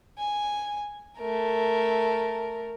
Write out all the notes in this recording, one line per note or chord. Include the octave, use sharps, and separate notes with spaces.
G#5
A3 A#4